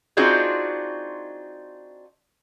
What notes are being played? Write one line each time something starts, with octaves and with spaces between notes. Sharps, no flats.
C4 D4 D#4 F4 F#4 G#4